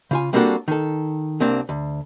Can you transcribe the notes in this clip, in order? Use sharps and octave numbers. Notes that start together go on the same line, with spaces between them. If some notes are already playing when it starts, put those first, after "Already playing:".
C#3 F4 G#5
G3 A#3 C4 D4 F#4 A4
D#3 A4
C2 A#3 C4 D4
D2